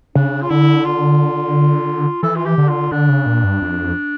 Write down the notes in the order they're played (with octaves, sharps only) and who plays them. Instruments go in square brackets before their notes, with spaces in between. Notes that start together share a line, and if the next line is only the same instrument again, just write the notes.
[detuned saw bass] C#3 [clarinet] D4
[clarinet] F4
[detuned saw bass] D3 [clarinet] E4
[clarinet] F4
[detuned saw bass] E3 [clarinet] A4
[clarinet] F4
G4
[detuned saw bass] D3
[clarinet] F4
[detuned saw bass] D3 [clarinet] D4
[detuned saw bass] C#3
A#2
G2
F2